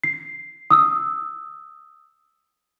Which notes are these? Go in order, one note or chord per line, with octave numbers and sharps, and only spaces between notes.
C7
D#6 E6